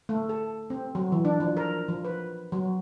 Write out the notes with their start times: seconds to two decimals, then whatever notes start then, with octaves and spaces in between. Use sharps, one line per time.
0.09 A3
0.29 A4
0.70 C4
0.95 F#3
1.12 E3
1.25 D4
1.40 F3
1.57 A#4
1.88 F3
2.05 B4
2.52 F#3